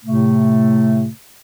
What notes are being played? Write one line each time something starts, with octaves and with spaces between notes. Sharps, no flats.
A2 C3 A3